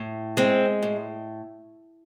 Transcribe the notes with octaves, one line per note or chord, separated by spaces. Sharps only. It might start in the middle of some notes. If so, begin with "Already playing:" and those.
Already playing: A2
G#3 C4
A2